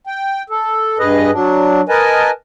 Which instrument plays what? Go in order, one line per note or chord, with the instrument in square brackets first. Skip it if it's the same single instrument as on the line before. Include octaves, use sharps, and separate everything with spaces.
[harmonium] G5
A4
G2 G#4 B4 D#5
F#3 D4
A#4 B4 D#5 G#5 A5